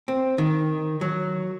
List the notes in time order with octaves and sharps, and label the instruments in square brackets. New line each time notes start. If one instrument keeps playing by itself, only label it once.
[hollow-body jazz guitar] C4
D#3
F#3